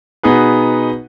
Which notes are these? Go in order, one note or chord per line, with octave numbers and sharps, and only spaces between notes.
B2 B3 D#4 G#4 B4